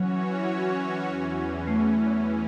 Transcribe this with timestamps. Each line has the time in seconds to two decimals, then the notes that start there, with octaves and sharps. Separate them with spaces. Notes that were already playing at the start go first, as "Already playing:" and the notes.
Already playing: E3 F#3 C#4 F#4 C#5
1.05 E2 E3 C#4
1.67 A3